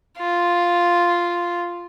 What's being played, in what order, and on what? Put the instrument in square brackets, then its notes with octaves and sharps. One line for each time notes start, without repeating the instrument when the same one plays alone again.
[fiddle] F4